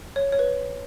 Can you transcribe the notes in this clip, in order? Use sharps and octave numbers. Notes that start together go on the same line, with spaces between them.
C#5
C#5
B4